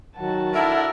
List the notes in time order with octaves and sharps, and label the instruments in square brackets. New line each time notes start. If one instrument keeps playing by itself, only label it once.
[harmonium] D#3 F#3 [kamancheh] F#4 A5
[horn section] D4 E4 A#4 [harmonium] A4 [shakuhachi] E5